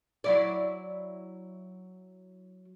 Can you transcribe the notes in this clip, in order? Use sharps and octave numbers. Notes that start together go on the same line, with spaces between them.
F#3 E4 D5